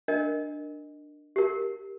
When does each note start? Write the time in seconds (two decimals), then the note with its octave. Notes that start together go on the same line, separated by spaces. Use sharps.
0.08 D4 A#4 D#5
1.36 G4 A#4